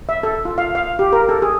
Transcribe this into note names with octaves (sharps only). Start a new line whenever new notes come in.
E5
A4
F4
F5
F5
G4
A#4
A4
G#4